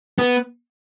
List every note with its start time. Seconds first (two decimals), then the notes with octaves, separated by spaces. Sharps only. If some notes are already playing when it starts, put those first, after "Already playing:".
0.19 B3